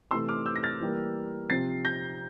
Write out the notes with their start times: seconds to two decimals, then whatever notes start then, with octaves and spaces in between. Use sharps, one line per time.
0.11 C3 E3 A3 C6 E6
0.28 D6 F6
0.46 E6 G6
0.56 A#6
0.63 F6 A6
0.81 E3 G3 A#3
1.50 C3 F3 C4 A6 C7
1.85 G6 A#6